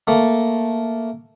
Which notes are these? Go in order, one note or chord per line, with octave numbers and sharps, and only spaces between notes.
A3 A#3